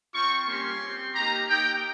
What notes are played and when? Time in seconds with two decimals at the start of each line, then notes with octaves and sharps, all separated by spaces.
0.13 C4 F4 C#6
0.47 G3 A#3 C#4 G4 C6
0.81 C4 G4
1.14 A#3 D#4 G4 A#5
1.48 A#3 D#4 G4 G5